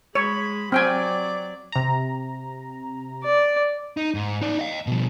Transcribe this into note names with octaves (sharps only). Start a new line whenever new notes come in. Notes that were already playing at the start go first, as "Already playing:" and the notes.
G#3 C#5 B5
F#3 C4 D5 G5 G#5
C3 A#5
D5
D#4
G#2
D#4 D5
D#5 F5
B2 F3